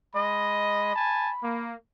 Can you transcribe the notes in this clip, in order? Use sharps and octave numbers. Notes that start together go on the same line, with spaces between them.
G#3 D#5 B5
G#5 A5
A#3